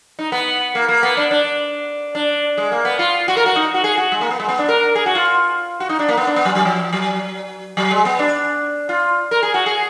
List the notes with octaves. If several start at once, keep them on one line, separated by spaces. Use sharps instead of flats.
D#4
B3
A#3
A#3
B3
D4
D4
D4
G#3
A#3
B3
F4
F#4
A#4
F#4
D#4
F#4
G#4
F#4
G#3
A#3
B3
G#3
B3
D4
A#4
G#4
F#4
F4
F#4
D#4
D4
A#3
B3
D4
B3
F#3
F#3
F3
F#3
F#3
G#3
B3
D4
F4
A#4
G#4
F#4
G#4